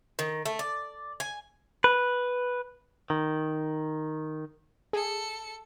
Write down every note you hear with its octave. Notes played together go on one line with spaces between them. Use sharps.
D#3
A3
D5
G#5
B4
D#3
G#4 A4 C#7